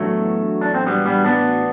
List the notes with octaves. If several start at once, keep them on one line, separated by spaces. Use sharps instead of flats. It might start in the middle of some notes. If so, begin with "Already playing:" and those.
Already playing: A2 E3 F#3 A3 B3 D4 F#4
D4
C4
G3 B3
G3 B3
B3 D4